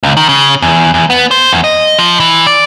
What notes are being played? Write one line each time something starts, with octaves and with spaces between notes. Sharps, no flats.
C#2
D#3
C#3
E2
E2
B3
C5
E2
D#5
F3
E3
D5